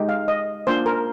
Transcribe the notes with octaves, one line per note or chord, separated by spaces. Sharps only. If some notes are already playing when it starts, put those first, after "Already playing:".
Already playing: G#3 D#4 G4
F5
D#5
A#3 D4 F4 C5
A#4